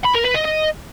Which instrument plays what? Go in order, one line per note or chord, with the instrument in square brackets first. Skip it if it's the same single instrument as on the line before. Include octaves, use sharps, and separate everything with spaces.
[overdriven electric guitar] B5
A#4
B4
D#5
D#5